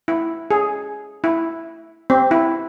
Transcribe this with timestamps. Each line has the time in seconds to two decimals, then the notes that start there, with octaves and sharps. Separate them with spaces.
0.08 E4
0.51 G#4
1.24 E4
2.10 C4
2.31 E4